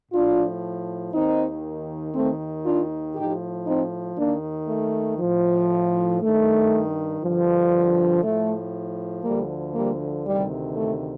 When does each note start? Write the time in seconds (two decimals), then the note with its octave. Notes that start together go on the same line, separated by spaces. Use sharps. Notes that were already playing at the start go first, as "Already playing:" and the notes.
0.12 A2 F3 D4 F4
1.13 D#2 D#3 C4 D#4
2.14 D#2 D#3 A3 C4
2.65 D4 F4
3.16 A2 F3 D#4 G4
3.66 C4 D#4
4.17 D#2 D#3 A#3 D4
4.68 A3
5.19 A2 F3
6.20 G2 D#3 A3
7.21 G2 D3 F3
8.23 A2 F3 A3
9.24 D2 D3 F3 G3 A#3
9.75 G3 A#3
10.26 D2 C3 D#3 G3
10.76 A3